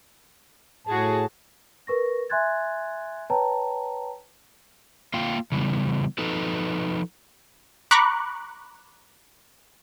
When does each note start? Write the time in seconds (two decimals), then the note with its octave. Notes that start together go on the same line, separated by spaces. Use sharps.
0.87 A2 F#4 G#4 A5
1.87 A#4 B4 C#6 A#6
2.29 E5 G#5 C6 F#6 G#6 A6
3.30 B4 C#5 G5 A5 A#5
5.14 A#3 F4 F5 G5
5.52 C#3 E3 G3 B3
6.18 F3 D#4 A4 B4
7.91 A#5 B5 C#6 D6 F#6